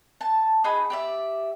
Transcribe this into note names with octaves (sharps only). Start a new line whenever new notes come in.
A5
D#4 F#4 G#4 B5
G4 D5 E5